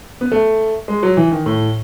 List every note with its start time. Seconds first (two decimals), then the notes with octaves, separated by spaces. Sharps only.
0.21 B3
0.32 A3
0.88 G#3
1.03 F#3
1.17 E3
1.31 D#3
1.46 A2